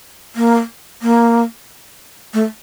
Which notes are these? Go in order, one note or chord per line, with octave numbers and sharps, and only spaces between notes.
A#3
A#3
A3